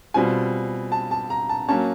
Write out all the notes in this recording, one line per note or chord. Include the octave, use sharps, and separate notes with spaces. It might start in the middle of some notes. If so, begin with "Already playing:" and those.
B2 G3 C4 F4 G#5
A5
A5
A#5
A5
F#3 A#3 C#4 A5